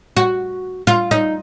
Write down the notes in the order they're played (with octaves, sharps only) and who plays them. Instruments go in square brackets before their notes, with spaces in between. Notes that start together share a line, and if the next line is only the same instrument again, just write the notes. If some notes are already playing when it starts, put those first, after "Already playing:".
[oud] F#4
F4
D#4